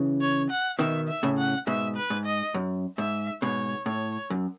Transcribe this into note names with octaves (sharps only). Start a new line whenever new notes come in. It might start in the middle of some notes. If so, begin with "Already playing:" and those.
Already playing: C#3 E3
C#5
F#5
B2 D#3 E5
E5
A2 C#3
F#5
G#2 B2 E5
B4
G#2
D#5
F#2
G#2 E5
G#2 B2 C#5
A2 C#5
F#2